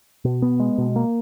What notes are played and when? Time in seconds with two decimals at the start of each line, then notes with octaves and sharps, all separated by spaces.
0.25 B2
0.42 B3
0.60 G#3
0.78 B2
0.96 A#3